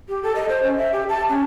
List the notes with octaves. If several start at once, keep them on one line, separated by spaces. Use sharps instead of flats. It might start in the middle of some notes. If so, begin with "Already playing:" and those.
G4
A4
D#5
C5
C#4
E5
G4
A5
C#4